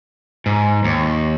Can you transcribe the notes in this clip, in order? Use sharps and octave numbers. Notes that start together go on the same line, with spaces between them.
G#2
D#2